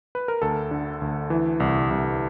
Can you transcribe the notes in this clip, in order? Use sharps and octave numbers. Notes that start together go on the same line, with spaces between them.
B4
A#4
D2 A4
D3
D2
E3
C2
C2